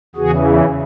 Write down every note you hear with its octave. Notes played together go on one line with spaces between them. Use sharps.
E2 C#3 E3 F#4 G#4